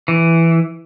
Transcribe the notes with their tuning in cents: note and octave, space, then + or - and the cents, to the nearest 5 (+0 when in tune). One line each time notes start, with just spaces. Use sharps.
E3 +5